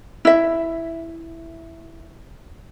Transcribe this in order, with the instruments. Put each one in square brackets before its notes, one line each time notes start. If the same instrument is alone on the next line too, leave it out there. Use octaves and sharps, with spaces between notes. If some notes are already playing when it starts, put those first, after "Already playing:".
[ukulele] E4 E5